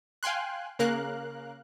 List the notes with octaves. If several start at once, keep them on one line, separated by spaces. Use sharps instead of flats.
F5 G5 G#5 C6 F#6
C#3 A#3 A#4 F5 F#6